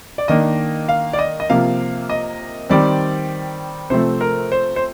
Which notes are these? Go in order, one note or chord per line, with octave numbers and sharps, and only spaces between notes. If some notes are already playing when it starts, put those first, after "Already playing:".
D5
D#3 A#3 D4 D#5
F5
D5
D#5
D#5
C3 F3 A#3 F5
D#5
D#3 G3 C4 D5
C3 F3 A3 C4 C5
A#4
C5
C5